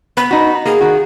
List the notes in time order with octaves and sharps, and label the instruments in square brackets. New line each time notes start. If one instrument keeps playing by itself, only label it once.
[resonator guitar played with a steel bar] B3 [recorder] B5
[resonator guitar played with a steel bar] D#4 F#4
[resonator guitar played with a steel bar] A#3 [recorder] G#4
[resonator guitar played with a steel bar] D#3 F#4